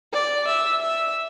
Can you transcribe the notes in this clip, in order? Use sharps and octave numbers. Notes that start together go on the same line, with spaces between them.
D5
E5
E5